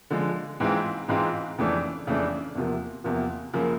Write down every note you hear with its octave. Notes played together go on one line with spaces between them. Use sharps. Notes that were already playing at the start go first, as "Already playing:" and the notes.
D3 F3 G#3
G#2 E3 G#3 C4 F4
G#2 E3 G#3 C4 F4
F2 C#3 E3 A3 D4
F2 C#3 E3 A3 D4
E2 C3 F3 A#3
E2 C3 F3 A#3
F#2 C#3 F3 A#3